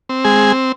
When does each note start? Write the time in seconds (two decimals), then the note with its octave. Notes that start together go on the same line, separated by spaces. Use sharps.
0.09 C4
0.24 G#3 G#4